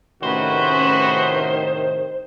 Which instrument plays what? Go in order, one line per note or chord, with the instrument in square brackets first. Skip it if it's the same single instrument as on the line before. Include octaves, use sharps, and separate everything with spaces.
[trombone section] A2 C3 D#3 [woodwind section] A3 C#4 B4 [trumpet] F#4 [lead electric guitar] C5